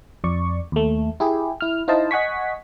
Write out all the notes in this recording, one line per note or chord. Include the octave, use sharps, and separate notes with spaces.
F2 D5 C#6
D#2 A3
E4 G4 G#4
E4 F6
D#4 E4 C5 D#5 F5 A5
D#5 F#5 G#5 C#6 B6